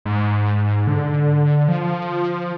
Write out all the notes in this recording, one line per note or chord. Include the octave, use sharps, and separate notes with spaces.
G#2
D3
F3